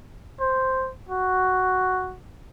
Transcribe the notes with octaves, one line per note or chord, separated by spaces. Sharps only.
C5
F#4